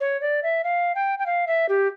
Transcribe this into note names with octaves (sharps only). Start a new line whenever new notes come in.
C#5
D5
E5
F5
G5
G5
F5
E5
G4